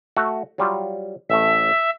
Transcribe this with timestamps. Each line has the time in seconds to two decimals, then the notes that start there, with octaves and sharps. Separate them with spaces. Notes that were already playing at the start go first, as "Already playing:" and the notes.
0.17 A3 F#4
0.58 F#3 G3 F4
1.30 A1 A3 E5